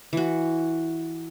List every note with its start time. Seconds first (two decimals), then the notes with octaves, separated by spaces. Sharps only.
0.13 E3 F#4